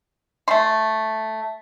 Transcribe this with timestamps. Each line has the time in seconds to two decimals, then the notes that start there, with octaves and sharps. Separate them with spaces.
0.48 A3 C6